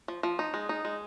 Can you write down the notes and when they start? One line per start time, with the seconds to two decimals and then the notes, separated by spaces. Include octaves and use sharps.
0.08 F3
0.23 F3
0.39 D#4
0.54 G#3
0.69 D#4
0.85 G#3